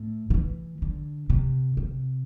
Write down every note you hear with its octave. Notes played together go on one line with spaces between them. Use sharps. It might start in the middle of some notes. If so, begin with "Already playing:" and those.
Already playing: A2
D3
E3
D3
C3
C3